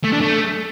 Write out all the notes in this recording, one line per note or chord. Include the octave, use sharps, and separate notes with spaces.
A3
D4
A3